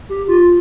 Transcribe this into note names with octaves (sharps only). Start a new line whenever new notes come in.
G4
F4